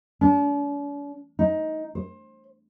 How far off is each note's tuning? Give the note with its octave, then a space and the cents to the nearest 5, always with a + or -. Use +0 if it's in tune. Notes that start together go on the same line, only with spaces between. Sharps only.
D4 -45
D#4 +15
C5 +25